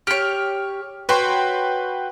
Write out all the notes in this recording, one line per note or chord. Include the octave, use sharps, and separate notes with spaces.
G4 C#5 F6
F#4 B4 C#5 G5 C6